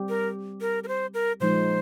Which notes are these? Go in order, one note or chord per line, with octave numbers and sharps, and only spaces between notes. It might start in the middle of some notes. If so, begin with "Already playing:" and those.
Already playing: G3 C4 G4
A#4
A#4
A#4
C5
A#4
A#2 F3 G#3 D#4 C5